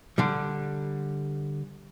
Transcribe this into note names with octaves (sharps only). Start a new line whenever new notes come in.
D3 G3